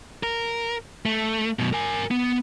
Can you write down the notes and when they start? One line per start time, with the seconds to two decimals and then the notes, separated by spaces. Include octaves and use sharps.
0.23 A#4
1.06 A3
1.59 F#2 B2
1.73 A#4 G#5
2.11 B3